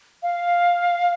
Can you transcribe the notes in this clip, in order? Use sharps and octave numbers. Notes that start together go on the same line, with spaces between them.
F5